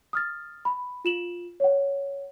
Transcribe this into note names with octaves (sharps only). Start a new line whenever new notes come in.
D#6 F6 A6
B5
F4 E7 F#7
C#5 F#5